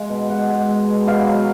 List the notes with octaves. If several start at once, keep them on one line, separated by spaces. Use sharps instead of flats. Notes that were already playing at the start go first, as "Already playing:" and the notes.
Already playing: G#3 F5
B2
B2 F#5
G#3
G#3
B2
B2 F5
F#3